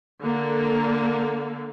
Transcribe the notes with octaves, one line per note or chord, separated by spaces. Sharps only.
D3 A#3